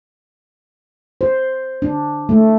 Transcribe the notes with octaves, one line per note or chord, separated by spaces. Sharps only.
C5
D4
A3